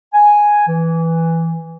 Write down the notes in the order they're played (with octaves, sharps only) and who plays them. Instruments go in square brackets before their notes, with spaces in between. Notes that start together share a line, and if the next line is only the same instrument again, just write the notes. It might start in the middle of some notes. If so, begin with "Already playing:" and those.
[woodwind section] G#5
E3